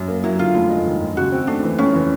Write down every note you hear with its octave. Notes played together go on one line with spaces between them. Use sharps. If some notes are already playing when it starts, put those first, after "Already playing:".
Already playing: F#2
A#3
F#3 E4
D3 F4
F1
G#3
D#3
D#2
C#3 F#4
C4
A3 D4
E3
F1 C#4
E3